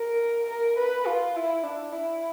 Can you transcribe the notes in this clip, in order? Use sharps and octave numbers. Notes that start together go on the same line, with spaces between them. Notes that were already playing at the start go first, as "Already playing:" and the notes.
Already playing: A#4
A#4
B4
F4
E4
D4
E4